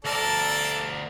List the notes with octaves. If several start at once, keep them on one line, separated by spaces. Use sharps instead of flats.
D2 A4 A#4 D5 A5